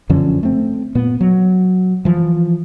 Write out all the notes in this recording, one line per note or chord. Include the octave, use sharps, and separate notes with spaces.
F#2 D3 F3 C#4
A3 C4
A#2 B3
F#3
E3 F3